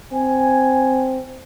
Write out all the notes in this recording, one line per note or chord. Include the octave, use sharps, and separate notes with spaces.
C4 G#5